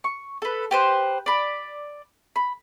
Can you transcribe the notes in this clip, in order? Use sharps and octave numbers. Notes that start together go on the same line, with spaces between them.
C#6
A4 B4
G4 B4 C5
D5 B5
B5